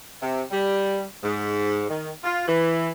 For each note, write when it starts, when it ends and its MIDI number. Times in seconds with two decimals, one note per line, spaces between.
0.22 0.43 48
0.51 1.04 55
1.23 1.85 44
1.89 2.11 51
2.24 2.47 65
2.48 2.91 52